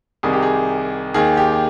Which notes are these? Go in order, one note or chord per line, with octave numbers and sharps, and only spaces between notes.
C2 C3 D#3 G#4
G4
G#4
D#2 D#3 G#4
G4